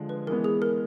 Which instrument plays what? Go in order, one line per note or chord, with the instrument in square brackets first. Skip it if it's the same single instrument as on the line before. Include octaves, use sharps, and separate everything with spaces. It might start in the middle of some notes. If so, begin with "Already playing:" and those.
Already playing: [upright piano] D3 F3 G#3
[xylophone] B4
[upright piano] E3 G#3 B3 [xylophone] A#4
[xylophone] G#4
A#4